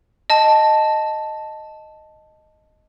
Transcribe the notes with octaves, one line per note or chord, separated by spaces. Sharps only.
D#5 A5